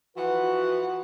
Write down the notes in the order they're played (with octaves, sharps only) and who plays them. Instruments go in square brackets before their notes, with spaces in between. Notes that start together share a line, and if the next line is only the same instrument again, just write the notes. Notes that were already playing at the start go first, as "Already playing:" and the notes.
[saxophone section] E3 F3 F#5 [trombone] F#4 [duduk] B4